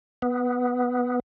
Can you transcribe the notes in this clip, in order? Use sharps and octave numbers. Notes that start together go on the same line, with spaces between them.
B3